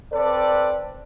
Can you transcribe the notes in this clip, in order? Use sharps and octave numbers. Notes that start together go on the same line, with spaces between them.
C4 A4 B4 D5